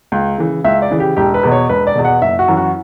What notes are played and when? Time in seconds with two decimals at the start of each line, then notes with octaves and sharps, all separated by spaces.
0.12 C#2
0.38 C#3 E3
0.64 C#2 E5
0.82 D5
0.91 C#3 E3
1.00 G4
1.16 E1 G4
1.34 B4
1.43 E2 B2
1.52 C#5
1.69 E1 B4
1.87 D5
1.95 E2 B2
2.05 F#5
2.21 F#1 E5
2.39 F#4
2.48 F#2 E3
2.57 F#4